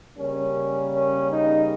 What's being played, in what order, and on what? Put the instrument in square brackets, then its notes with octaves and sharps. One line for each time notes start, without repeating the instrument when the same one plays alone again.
[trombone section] C#3 G3 A#3 C#4
C#4
D#4